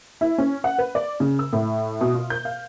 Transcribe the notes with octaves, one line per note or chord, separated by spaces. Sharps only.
E4
C#4
F#5
B4
D5
C#3
E6
A2
B2
F4
G6
F5